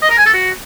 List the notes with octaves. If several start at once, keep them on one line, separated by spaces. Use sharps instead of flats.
D#5
A#4
G#5
A4
F#4